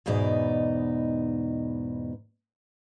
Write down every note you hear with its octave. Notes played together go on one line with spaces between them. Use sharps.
E2 G#2 B2 D#4 D5